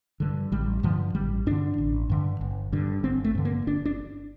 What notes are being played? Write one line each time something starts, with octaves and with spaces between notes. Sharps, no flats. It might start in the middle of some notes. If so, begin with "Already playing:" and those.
G2 D3
A1 G3
G2 D3 F3
A1 G3
G2 D3 D4
A1
G2 D3
G1
G2 D3
G1 C4
A3
G2 D3
A#3
G1 D4
D4